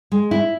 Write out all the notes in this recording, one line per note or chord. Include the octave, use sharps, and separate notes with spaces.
G#3
E4